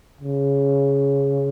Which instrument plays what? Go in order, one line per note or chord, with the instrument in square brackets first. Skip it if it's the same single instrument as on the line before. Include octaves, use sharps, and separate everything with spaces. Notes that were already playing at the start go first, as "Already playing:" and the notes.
[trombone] C#3